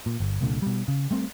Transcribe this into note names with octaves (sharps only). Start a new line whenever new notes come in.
A#2
G1
C2 A#2 D3
B2 G3
C#3
G3 A3 C4